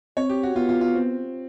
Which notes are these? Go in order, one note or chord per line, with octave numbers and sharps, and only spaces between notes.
C4 C#5
G4
F#4
B3 F4
F4
F4
C4